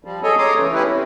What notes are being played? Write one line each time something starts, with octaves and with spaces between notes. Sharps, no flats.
F3 G3
G#4 A4 C#5 D#5 G#5
C#5 A#5 C6 D6 D#6
C#3 E3 A3
A3 C#4 E4 G4 B4
C4